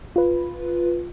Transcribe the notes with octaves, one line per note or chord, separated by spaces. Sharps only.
F4 B4